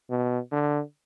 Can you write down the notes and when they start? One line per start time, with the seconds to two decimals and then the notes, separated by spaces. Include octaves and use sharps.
0.10 B2
0.52 D3